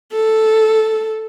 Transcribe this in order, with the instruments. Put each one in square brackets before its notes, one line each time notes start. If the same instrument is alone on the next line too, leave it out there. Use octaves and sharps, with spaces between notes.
[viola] A4